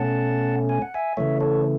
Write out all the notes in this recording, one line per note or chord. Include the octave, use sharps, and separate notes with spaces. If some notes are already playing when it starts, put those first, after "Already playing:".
Already playing: B2 A3 C#4 F#5 A5
G#5
F#5
E5 G#5
C#3 E3 A3 C#5 E5
A4 C#5